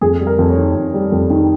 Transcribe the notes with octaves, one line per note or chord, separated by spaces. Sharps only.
F2 G#4
G3
A#4
F2
C#5
D#3
F2
G3
F2
D#3